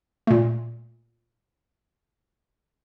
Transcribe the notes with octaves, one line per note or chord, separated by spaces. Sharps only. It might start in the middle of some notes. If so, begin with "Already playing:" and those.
A#2 A3